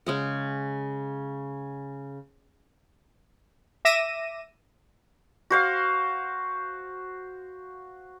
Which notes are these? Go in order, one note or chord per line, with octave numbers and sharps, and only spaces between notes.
C#3 G#3 F#5
E5 D6 A#6 D#7 E7
F#4 C5 F5